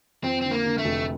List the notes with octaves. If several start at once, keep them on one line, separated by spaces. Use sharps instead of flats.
F2 C4
D3 C4
A#3
D3
A3
F1